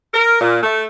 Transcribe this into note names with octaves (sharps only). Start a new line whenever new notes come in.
A#4
A#2
A3